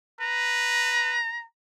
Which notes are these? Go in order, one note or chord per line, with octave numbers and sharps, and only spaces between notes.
B4 A#5